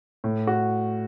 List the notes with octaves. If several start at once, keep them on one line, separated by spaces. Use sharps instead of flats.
A2
F#4